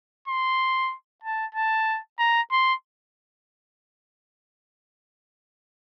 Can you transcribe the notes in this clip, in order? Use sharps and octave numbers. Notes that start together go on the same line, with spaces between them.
C6
A5
A5
A#5
C6